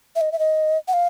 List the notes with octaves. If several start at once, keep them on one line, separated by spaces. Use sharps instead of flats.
E5
D#5
E5
D#5
F#5
F5